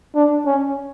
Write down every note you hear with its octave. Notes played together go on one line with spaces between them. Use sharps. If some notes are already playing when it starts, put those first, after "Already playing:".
D4
C#4